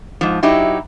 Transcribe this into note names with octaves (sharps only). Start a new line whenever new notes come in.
G#2 F3
F#3 D#4 E4 G4